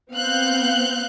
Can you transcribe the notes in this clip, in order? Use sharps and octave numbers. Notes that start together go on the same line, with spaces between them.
B3 C4 F5 F#6 G6